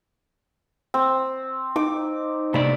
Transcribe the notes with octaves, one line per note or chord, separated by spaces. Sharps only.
C4
D#4 D6
C3 A3 D5 B5